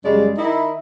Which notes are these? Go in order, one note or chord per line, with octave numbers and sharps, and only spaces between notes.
F#2 C#3 G3 G#3 D5
D#3 D#4 E4